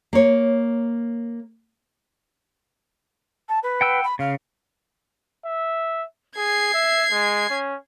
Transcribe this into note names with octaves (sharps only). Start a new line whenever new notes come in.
A#3 C#5
A5
B4
F#5 G5 E6
B5
C#3 F5
E5
G#4 G#6 C7
E5
G#3
C#4